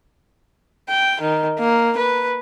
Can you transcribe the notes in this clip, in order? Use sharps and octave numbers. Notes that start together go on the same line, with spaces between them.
G5
D#3
A#3
B4